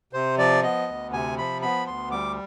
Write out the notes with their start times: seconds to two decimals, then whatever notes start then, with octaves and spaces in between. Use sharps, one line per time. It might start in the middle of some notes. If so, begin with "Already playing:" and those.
0.13 C3 C5
0.38 F3 D5
0.63 B3 D#5
0.88 D2
1.13 C3 G#5
1.37 F3 B5
1.62 B3 B5
1.86 D2 C6
2.11 G3 D6